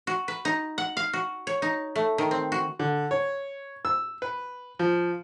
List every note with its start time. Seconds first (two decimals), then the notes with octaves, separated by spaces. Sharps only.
0.07 F#4
0.28 B4
0.45 D#4
0.78 F#5
0.97 F5
1.13 F#4
1.47 C#5
1.62 D#4
1.96 A3
2.18 D#3
2.31 C4
2.52 F#4
2.79 D3
3.11 C#5
3.85 E6
4.22 B4
4.79 F3